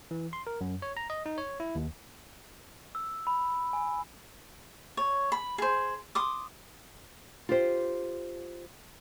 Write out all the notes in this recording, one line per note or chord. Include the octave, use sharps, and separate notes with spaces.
E3
C6
A#4
F#2
C#5
A#5
D#5
D#4
C#5
E4
D#2
E6
B5
G#5
C#5
B5
G#4 C5
C6 D6 D#6
F4 G4 C5